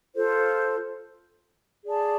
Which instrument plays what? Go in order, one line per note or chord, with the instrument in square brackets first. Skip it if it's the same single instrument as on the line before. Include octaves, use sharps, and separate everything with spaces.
[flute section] F4 A4 C5
G#4 D5 A5